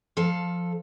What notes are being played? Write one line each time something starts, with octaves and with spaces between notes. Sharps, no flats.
F3 A4 F5 A5